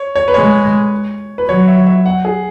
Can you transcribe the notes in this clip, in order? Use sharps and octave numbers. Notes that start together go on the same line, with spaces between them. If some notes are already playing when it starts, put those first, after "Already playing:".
Already playing: C#5
C#5
B4
G#3 C#5
B4
F#3 C#5
E5
E5
F#5
G#4